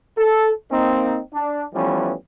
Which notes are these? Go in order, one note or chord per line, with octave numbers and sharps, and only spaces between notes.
A4
A#3 C4 D#4
D4
E3 F3 G3 A3 B3 C#4